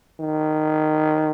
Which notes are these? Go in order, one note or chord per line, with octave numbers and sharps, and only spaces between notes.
D#3